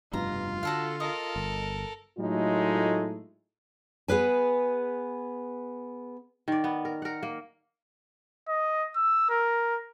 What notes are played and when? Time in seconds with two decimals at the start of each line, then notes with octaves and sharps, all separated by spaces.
0.13 F1 G2 B2 F4 A#5
0.63 D3 F#4 A4 F5
1.00 A4 A#4 D#5
1.36 G1
2.17 A2 F#3 G#3 A3 D#4 F4
4.08 B3 G#4 B4 G#5
6.48 D#3 D5
6.64 B3
6.85 A#4
7.02 A#4 F#5
7.23 A#3
8.48 D#5
8.96 E6
9.30 A#4